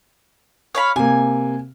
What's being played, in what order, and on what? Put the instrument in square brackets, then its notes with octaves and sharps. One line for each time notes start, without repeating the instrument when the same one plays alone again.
[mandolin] C#5 F5 B5
[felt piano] C3 A#3 [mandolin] G#5